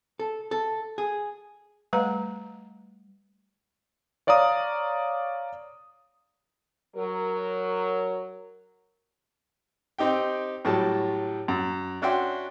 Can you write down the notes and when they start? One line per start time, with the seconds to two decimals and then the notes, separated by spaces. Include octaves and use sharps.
0.19 A4
0.51 A4
0.98 G#4
1.93 G3 A3 B4 F#5 A#5
4.27 C#5 D5 F5 A#5 D#6
6.96 F#3 A#4
9.98 C4 D#4 G4 G5
10.65 A2 F#3 G3 A5
11.48 F#2
12.02 C#4 D4 F#4 E5 G5 C6